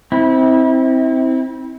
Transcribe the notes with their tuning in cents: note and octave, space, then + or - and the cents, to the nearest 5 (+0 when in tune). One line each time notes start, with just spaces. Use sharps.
C4 +0 E4 -35